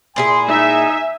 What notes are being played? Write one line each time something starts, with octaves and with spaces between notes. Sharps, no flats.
A#2 E4 G#4 G#5 C6
D#4 E5